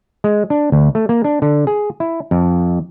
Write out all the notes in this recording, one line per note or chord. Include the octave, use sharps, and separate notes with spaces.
G#3
D4
D2
A3
A#3
D4
D3
G#4
E4
F2